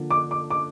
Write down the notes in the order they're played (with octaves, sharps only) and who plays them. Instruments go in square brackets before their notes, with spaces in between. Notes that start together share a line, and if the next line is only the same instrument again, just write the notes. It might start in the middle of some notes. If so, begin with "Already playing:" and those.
Already playing: [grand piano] D3 F3 A#3 D4
[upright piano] D6
D6
D6